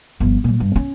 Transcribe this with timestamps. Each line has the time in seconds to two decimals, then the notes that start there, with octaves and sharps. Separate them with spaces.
0.20 G1 F3
0.44 A#2 F#3
0.60 G2
0.76 C#4